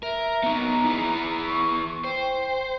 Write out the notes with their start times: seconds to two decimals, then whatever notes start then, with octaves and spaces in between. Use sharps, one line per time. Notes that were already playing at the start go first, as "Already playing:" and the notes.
0.03 A#4 E5
0.43 B3 D#4 A#5
0.86 E4 G#4 B4
1.46 C#6
2.04 C5 G5